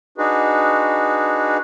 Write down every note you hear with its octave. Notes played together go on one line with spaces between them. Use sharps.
D4 D#4 F#4 G#4 B4